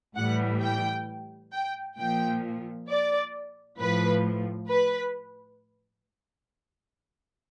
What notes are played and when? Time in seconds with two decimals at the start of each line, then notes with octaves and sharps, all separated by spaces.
0.16 A2 E3 G3 F#5
0.61 G5
1.53 G5
1.98 A#2 F3 G5
2.88 D5
3.79 A2 F3 B4
4.69 B4